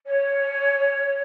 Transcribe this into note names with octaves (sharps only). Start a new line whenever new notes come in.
C#5